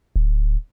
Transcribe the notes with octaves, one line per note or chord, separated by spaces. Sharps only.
D1